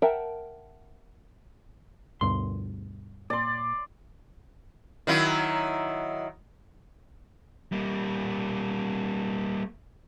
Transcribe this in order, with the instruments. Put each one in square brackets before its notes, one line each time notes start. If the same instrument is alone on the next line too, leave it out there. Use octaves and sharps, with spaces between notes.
[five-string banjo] A#4 E5 F#5 G5 A5
[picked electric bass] D2 G2 B2 [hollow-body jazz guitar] C6
[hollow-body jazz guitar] A#2 [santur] D5 C6
[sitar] D#3 F#3 E4
[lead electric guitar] G3 A#3